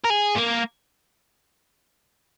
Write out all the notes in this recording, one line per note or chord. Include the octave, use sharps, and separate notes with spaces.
A#4
G#4
A#3